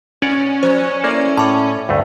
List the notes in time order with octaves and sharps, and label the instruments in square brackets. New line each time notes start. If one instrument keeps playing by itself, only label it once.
[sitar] A#2 [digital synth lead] C#4 [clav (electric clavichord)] C#5 D5 F#5
[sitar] F3 [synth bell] C5
[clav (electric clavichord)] A#3 [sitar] E4 A4 D5
[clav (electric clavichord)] A2 [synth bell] A5 D6
[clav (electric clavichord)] D2 G2 A3